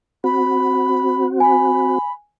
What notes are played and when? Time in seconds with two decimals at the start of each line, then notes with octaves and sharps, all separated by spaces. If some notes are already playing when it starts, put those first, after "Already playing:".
0.24 C4 F#4 B5
1.40 G#5 B5